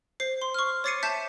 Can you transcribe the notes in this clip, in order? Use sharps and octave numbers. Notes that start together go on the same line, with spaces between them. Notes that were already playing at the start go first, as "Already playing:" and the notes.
C5 C7
C6
C#6 F6
C#5 D6 A6 C7 C#7 D#7
E5 A5 G6 B6 E7